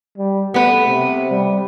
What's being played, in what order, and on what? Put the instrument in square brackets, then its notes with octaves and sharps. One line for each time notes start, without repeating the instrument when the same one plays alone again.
[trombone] G3
[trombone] A3 [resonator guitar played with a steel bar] B3 B4
[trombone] C3
G3